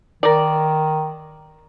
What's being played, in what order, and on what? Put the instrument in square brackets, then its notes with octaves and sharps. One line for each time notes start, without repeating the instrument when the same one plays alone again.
[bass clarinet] D#3 [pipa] A#4 D5